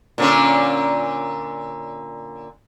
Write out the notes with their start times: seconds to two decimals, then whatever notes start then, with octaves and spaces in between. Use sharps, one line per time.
0.18 A#2 D3 C#4